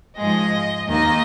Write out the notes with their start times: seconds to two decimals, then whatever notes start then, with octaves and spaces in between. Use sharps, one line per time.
0.17 G#2 F3 G#3 D#5
0.88 D#2 D#3 A#3 D#5